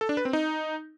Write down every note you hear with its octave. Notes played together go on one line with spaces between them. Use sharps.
A4
D4
B4
C4
D#4